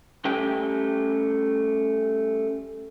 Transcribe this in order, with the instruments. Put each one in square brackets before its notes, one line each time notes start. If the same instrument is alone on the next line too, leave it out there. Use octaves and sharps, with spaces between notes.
[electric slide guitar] G3 A3 C#4 G4 G5